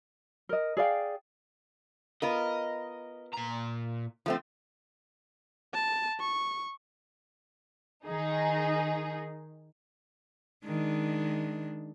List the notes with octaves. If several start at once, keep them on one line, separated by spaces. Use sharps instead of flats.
A#4 D#5
G#4 D5 F5 G5
B3 F4 A#4 D#5
A#2 A#5
F3 A3 C4
A5
C#6
D#3 D#4 G#4
D#3 G#3 D4